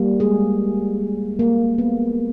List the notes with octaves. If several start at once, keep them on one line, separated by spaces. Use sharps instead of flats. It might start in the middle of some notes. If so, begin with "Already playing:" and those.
Already playing: G3 A#3
G#3 G#4
A#3
B3